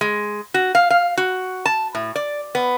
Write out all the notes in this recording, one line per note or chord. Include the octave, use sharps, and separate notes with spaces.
G#3
F#4
F5
F5
F#4
A5
A2
D5
B3